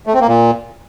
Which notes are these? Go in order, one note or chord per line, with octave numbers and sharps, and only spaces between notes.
A3
C4
A#3
A#2